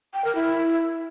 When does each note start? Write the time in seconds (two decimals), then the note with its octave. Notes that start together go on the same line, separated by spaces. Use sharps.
0.14 G5
0.25 A#4
0.35 E4